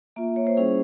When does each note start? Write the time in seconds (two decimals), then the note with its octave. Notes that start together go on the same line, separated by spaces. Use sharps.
0.16 A#3 F4 E5
0.36 C#5
0.47 C5
0.57 G3 C#4 E4 G#4